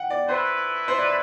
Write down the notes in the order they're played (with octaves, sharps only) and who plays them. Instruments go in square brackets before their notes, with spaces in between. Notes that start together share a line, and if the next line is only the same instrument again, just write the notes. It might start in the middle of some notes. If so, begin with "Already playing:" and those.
Already playing: [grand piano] F#5 G5
D5
[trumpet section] A3 E4 B4 [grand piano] C5
[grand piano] C5
D5